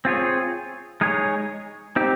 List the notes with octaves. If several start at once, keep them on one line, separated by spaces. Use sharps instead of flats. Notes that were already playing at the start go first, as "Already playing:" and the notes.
C4 F4 G#4 C#5
G#3 D#4 G#4 C#5
C4 D#4 G4